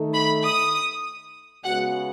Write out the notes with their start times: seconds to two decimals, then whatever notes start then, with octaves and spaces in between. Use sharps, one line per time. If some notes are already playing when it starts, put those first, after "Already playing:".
Already playing: D#3 A3 D#4 A4
0.14 B5
0.44 D#6
1.63 C#3 G#3 B3 F#4 F#5